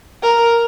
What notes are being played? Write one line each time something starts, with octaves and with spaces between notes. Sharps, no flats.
A#4